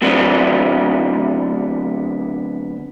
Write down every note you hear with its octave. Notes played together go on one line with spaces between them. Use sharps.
D2 F#3 B3 C4 D4